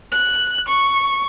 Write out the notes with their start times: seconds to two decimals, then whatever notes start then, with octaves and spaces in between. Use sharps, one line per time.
0.12 F#6
0.68 C#6